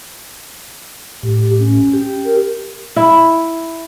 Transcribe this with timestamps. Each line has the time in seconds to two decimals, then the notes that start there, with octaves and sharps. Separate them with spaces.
1.23 A2 G4
1.59 C#4
1.93 G4
2.25 A#4
2.96 E4